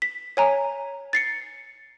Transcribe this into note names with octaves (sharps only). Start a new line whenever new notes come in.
B6
C#5 G#5 A#5
A6 C7 C#7